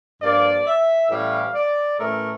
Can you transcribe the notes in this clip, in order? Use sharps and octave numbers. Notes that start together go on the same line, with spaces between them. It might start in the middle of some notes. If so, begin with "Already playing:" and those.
G2 F3 A#3 D5
E5
A2 E3 G3 C#4 F5
D5
A2 E3 A3 C#4 A#4